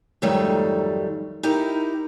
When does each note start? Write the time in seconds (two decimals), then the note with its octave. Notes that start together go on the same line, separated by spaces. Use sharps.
0.22 F2 G#2 D#3 F#3 G3 A3
1.43 D#4 E4 G4 A#4